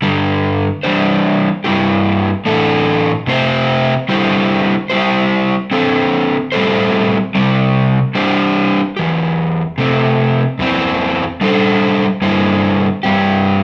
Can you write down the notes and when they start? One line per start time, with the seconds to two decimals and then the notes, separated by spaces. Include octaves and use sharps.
0.02 G2 D3 G3
0.83 E3 G3 D4 C5
1.64 G2 G3 C4 E4 G4
2.46 A2 E3 A3 D4 A4
3.27 C3 A3 C4 G4 C5
4.09 D3 G3 E4 G4 C5
4.90 G3 E4 G4 C5
5.71 D3 C4 A4 C5
6.52 A2 G3 C4 A4 C5
7.35 C3 G3 C4
8.15 G3 D4 G4 C5
8.97 E2 E3 G4
9.78 C3 A3 C4
10.59 E2 E3 C4
11.41 G3 D4 A4 C5
12.21 G2 D3 G3 E4 C5
13.03 G2 G3 C4 G4